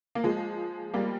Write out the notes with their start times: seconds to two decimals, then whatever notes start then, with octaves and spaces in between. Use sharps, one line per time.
0.15 A#3
0.24 F3 G#3
0.94 G3 A#3